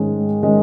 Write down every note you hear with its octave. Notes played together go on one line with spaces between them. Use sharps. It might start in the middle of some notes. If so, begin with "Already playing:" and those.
Already playing: G#2 D#3 G#3 C#4
D#3 G#3 C#4